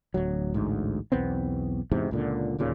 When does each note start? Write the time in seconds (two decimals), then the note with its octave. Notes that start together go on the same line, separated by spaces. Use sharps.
0.14 D1 D2 F#3
0.54 A1 D2 G#2
1.12 B1 E2 B3 C4
1.92 E2 G#2 C3
2.11 C#2 A#2 D3
2.58 D1 D#2 A#2 C#3